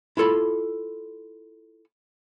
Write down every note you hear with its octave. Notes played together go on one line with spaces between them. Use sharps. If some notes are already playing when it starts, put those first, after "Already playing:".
E4 F4 A4 B5